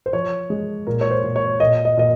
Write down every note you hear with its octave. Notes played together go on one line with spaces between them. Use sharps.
C5
F3 C#5
G#3
A#2 A#4
C#5
C5
A#2
C#5
A#2 D#5
D#5
A#2 D#5